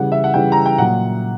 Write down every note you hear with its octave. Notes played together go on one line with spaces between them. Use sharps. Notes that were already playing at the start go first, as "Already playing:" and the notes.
Already playing: C#3 E3 G3 F#5
E5
F#5
C#3 E3 G3 G5
A#5
G5
A#2 F#3 F#5